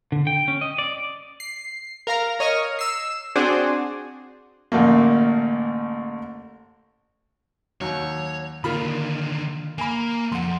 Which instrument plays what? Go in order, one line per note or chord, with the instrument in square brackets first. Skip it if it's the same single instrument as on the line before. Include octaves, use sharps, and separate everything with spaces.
[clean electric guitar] D3
G5
C#4
D#5
D5
[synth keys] C7
A#4 F5 A#5
A#4 C#5 D#5 F6
E6 C7
C4 D4 F#4 G#4 C5 D5
[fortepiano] A1 D3 A3 A#3
[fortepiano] D#2 F#3 [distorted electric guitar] C#5
[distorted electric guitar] D3 D#3 [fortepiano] A#3 F4 B5
[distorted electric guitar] A#3 [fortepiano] G#5 B5
[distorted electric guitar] F2 [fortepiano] F#5 C6